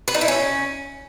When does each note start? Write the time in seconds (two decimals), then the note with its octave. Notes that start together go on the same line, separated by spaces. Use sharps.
0.08 B4
0.14 D#4
0.21 E4
0.28 C#4